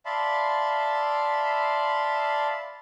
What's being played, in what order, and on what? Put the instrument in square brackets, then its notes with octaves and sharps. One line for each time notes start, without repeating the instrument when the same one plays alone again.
[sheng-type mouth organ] D5 E5 F5 A5 B5 C6